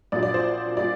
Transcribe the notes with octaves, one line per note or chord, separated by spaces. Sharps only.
A#1 A#2 F#3 D5
D5
C5
A#2 G3 D5